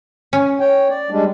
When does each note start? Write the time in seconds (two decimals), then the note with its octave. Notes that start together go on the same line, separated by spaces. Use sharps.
0.33 C#4
0.60 C#5 G5
0.89 D5
1.11 G3 G#3 D4